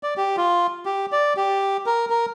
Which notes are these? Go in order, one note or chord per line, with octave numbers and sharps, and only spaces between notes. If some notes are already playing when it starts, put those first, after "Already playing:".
D5
G4
F4
G4
D5
G4
A#4
A#4